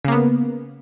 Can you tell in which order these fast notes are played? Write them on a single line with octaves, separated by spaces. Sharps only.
C#3 A#3 B3